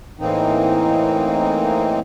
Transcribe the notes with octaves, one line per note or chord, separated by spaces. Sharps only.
A2 E3 A#3 C4 D#4